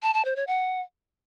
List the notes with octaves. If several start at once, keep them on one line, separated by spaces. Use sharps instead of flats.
A5
A5
C5
C#5
F#5